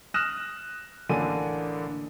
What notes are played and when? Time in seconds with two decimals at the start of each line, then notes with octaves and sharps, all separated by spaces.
0.14 D#6 F6 F#6 A#6 E7
1.09 A1 D3 A#3 D4 G#5 D#7